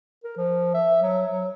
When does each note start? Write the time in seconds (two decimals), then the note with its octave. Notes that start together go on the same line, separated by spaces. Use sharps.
0.24 A#4
0.37 F3
0.74 E5
1.02 F#3
1.29 F#3